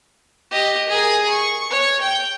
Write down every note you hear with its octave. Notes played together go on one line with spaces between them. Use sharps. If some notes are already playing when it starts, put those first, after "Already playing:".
G4 D#5
G#4 A#4
C#6
C#5
G5